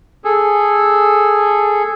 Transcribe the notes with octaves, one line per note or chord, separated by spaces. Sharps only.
G#4 A4